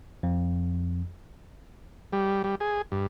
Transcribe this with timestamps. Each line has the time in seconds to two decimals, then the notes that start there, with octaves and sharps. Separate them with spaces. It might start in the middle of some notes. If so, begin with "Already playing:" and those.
0.23 F2
2.13 G3
2.44 G3
2.60 G#4
2.92 G2